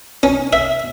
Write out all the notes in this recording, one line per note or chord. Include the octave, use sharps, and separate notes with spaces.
C#4
E5